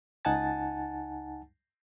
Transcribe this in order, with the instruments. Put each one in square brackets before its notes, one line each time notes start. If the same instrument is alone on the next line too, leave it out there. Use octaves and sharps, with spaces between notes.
[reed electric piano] C#2 D#4 F#5 G#5 A5 A6